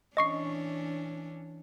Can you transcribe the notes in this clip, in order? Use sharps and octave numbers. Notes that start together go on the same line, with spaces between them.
E3 C#4 D4 D#5 C#6 C7